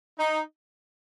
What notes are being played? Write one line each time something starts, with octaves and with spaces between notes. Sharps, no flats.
D#4